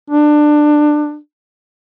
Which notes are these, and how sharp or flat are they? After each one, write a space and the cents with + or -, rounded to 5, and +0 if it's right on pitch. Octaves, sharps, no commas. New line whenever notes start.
D4 +20